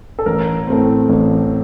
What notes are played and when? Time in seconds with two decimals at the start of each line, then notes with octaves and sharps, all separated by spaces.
0.19 A4
0.26 A1 A#4
0.67 A2 A3 C4
1.09 A1